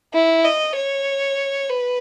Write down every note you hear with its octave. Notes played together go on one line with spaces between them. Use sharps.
E4
D#5
C#5
B4